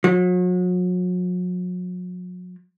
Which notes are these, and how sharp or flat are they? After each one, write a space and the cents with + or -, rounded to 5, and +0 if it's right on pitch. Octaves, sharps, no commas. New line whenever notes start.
F#3 -40